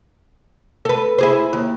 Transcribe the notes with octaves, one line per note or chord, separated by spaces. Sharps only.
A4 B4
E4 G#4 C5
D#2